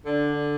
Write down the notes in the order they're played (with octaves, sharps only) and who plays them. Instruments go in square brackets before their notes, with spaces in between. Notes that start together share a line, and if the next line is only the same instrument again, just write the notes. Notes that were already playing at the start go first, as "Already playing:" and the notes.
[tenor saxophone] D3 [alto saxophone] D4